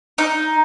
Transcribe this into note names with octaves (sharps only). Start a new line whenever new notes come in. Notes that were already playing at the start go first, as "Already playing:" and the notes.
D#4